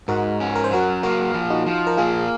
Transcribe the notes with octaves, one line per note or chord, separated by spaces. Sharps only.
G#2 F#4 A#4
C#4
A#4
C5
F#3 F#4 A#4
A#3 F#4 A#4
F3
D#4 F#4
F3
A#4
A#3 F4 G#4